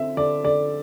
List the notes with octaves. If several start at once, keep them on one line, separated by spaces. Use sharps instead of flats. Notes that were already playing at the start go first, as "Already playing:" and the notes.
Already playing: D3 C4 E5
D3 D5
D3 D5